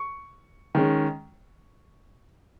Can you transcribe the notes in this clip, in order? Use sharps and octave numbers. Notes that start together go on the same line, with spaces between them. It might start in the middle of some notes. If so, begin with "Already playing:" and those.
Already playing: C#6
D#3 G#3 C#4